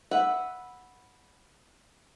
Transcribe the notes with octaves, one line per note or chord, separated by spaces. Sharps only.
B4 E5 F#5